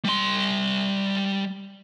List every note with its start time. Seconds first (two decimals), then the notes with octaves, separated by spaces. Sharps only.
0.05 G3 C6